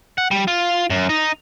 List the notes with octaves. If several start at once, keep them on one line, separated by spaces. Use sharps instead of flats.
F#5
G3
F4
F#2
D#4